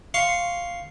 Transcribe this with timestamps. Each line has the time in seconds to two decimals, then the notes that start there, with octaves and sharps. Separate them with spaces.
0.14 F5 C6 C#6